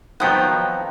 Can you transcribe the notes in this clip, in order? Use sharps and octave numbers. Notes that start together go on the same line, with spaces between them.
D#3 F3 F#3 B3 C4 D#4 F#5 G5